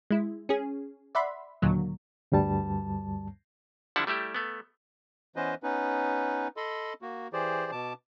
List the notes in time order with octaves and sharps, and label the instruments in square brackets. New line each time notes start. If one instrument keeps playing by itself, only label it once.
[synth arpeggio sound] G#3 E4
C#4 G#4
D5 E5 F#5 B5 C6
D#2 A#2 D3 F#3
[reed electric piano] D2 G2 G3 A5
[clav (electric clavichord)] D3 F3 G3 D4 E4 F#5
G3 A3 E4 G4
A3 B3
[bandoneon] E3 B3 C#4 B4 C5 D#5
B3 C#4 D#4 B4
A4 D#5 B5 C6
A#3 F#4
E3 G4 G#4 C5 D5
B2 A5 D6